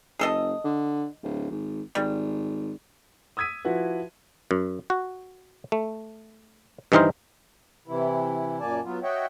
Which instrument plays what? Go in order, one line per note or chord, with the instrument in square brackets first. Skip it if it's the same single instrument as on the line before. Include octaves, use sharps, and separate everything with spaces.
[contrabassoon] F#1 [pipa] G#4 A4 D#5
[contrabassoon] D3
D1
G#1
[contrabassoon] G#1 [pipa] G3
[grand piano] D#6 E6 G#6 B6 D#7
F3 E4 F#4 B4
[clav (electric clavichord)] F#2
F#4
A3
G2 D#3 E3 D#4 A#4 C5
[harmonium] C3 E3 E4
F#2 A#2 A#3 D5 G#5 A5
F#3 B3 F4
F#4 C#5 D#5 E5 F#5 G5